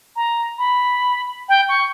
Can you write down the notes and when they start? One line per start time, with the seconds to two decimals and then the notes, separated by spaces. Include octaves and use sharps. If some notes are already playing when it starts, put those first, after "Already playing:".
0.16 A#5
0.58 B5
1.49 G5
1.69 C#6